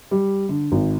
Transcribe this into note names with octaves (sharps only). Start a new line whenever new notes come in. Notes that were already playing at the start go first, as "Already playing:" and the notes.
G3
D3
G#1